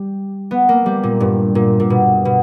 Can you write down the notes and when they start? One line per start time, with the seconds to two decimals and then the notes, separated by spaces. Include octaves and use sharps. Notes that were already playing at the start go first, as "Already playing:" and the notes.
Already playing: G3
0.51 B3
0.69 A#3
0.86 G3
1.03 A#2
1.20 G2
1.55 A#2
1.80 A#2
1.90 B2
2.25 B2